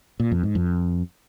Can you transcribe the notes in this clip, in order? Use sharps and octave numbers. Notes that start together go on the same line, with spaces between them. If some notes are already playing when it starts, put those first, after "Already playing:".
A#2
F2
G#2
F2